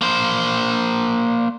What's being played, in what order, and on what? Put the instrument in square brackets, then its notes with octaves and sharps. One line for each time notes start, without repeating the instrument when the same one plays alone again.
[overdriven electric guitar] A#3 C5